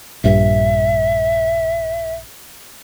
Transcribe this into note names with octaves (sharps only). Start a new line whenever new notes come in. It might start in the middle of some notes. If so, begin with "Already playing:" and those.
A#1 G2 E5